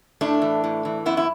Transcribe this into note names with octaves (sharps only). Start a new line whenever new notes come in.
A2 A3 D4
E3
A2
E3
F#2 B3 E4
E4